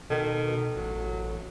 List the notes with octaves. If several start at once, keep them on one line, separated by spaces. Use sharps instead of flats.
B2 D#3 A4
A1 F#3